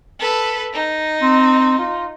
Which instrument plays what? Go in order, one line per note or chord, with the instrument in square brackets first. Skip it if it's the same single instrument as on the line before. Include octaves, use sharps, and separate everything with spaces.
[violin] A4 B4
D#4
[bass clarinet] C4
F4